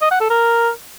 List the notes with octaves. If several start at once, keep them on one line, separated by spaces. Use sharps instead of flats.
D#5
F#5
A4
A#4